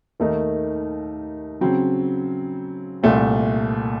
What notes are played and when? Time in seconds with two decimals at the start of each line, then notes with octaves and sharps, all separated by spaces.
0.20 D#2 D#3 A3 D#4 A#4
1.61 C#3 F#3 C4
3.03 C2 A#2 A3 C4